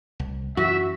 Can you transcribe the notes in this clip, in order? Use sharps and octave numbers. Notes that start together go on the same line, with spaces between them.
C2
F#2 E3 F#4 E5